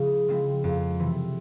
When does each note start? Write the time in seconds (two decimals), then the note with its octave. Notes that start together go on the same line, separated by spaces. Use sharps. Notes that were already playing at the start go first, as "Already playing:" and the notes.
Already playing: C#3 F3 G#3 E4
0.28 F3 G#3 C4 E4
0.64 F2
0.99 C3 E3